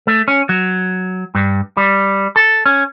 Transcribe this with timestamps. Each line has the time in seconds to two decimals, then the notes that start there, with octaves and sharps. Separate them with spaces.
0.07 A3
0.28 C#4
0.49 F#3
1.35 G2
1.77 G3
2.36 A4
2.66 C#4